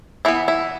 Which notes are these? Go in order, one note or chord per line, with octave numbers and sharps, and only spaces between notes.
E3 B3 E4
E4